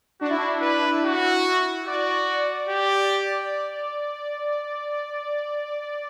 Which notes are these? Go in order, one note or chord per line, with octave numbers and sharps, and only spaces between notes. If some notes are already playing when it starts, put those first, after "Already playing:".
D4 F#4
E4
D4
B4
E4 F#4
F#4 D5
G4